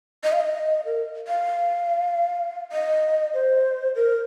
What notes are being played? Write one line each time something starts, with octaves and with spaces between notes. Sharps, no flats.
D#5
F5
D#5
A#4
F5
D#5
C5
A#4